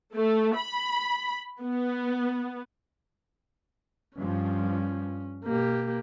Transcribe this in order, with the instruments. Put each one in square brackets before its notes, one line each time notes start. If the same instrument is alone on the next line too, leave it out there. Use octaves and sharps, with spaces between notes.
[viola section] A3
B5
B3
[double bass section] G2 F3 [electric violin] C#4
[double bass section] B2 [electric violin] A#3 G4